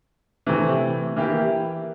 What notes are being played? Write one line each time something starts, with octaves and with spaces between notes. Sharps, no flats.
C3 E3 A3
E3 A#3 E4 G4